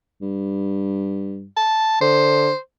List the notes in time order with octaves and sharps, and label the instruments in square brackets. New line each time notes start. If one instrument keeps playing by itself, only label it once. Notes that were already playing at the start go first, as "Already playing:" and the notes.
[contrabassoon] G2
[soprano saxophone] A5
[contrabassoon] D3 [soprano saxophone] C5